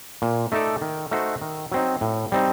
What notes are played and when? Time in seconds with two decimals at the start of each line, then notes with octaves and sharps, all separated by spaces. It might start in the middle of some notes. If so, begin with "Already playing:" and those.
0.22 A#2
0.52 A3 D#4 A4 D5
0.82 D#3
1.11 A3 D#4 F#4 C5
1.41 D#3
1.72 F#3 C4 D#4
2.01 A2
2.32 G3 C4 D#4